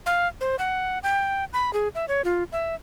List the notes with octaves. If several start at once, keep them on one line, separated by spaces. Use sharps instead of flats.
F5
C5
F#5
G5
B5
G#4
E5
C#5
F4
E5